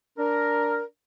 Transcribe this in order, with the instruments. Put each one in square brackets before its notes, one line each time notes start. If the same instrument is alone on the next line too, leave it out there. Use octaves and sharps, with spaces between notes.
[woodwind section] D4 A#4